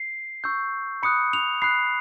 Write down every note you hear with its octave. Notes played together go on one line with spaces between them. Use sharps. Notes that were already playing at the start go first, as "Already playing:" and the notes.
Already playing: C7
C#6 E6 G6
B5 D#6 F#6 C#7
F7
B5 D#6 F#6 C7